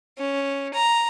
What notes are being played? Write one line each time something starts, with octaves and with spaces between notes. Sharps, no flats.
C#4
A#5